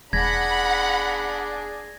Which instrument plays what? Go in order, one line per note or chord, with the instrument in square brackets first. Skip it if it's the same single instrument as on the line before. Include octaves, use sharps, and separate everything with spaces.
[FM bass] E1 [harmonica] D4 G#4 [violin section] F#5 B5 [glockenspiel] G#6 A#6